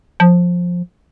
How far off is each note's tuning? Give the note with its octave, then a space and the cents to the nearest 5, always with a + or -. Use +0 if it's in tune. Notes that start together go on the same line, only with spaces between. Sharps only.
F3 +15